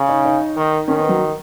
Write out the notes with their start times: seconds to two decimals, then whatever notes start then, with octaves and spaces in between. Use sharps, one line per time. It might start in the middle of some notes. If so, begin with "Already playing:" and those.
Already playing: C#3
0.09 D#4
0.25 D#4
0.56 D#3
0.88 D#3 C#4
0.98 B3
1.09 F#3